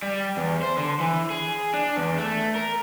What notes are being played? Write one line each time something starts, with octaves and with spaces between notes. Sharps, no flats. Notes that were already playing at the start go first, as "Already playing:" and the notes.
G3
E2
C5
D3
E3
G#4
D4
E2
A3
A#4